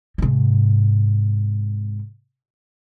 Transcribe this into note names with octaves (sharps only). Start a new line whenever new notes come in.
G#2 C3